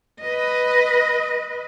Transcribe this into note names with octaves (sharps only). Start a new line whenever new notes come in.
B4 D#5